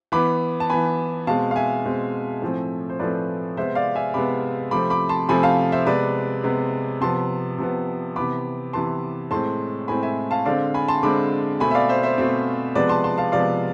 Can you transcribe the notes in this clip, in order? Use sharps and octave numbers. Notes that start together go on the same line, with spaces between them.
E3 B3 B5 D6
A5
E3 B3 G#5 B5
B2 G#3 C4 F5 A5
F5
E5 G#5
B2 G#3 C4
A2 F3 A3 C4
C5
A2 F3 A3 C4 B4 D5
C3 G#3 B3 C5 E5
D5 F5
E5 G#5
C3 G#3 B3 B5 D6
C3 F3 A3 C4 B5 D6
B5 D6
A5 C6
C3 F3 A3 C4 G#5 B5
F5 A5
C5 E5
C3 G#3 B3 B4 D5
C3 G#3 B3
C3 F3 B3 A5 C6
C3 F3 B3
C3 E3 B3 B5 D6
C3 E3 B3 A5 C6
A2 G#3 C4 A5 C6
A2 G#3 C4 G#5 B5
E5 G#5
F5 A5
D3 G#3 C4 D5 F5
G#5 B5
A5 C6
D3 G#3 C4 B5 D6
B2 A3 C4 G#5 B5
E5
D5 F5
C5 E5
C5 E5
B2 A3 C4
C3 F3 G#3 B3 B4 D5
A5 C6
A5 C6
F5 A5
C3 F3 G#3 B3 D5 F5